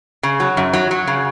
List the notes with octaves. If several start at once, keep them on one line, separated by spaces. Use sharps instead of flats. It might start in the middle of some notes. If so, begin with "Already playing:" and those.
C#3
F#3
F#2
F#3
F#3
C#3